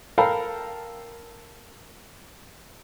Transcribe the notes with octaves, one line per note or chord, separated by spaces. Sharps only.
A4 A#4 F5 G5 A#5 B5